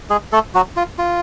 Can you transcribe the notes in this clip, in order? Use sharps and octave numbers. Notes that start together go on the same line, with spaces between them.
G#3 G#4
A3 A4
F#3 F#4
F4
F4